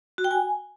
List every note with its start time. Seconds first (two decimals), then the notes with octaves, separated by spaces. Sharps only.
0.18 F#4
0.24 G5
0.31 G#5